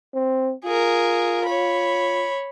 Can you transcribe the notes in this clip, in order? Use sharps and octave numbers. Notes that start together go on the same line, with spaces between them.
C4
F4 G#4 A#4
C#5 B5